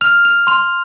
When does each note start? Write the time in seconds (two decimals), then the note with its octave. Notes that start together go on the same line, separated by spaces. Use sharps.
0.01 F6 F7
0.25 F7
0.47 C6 F7